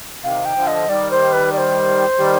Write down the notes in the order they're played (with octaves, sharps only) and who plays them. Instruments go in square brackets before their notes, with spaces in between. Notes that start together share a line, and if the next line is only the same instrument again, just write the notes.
[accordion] C3 D#3 [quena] F5
[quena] G5
[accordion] D3 F3
[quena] D#5
[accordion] D#3 G3 [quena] D5
[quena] C5
B4
D5
C5
[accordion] D#3 G3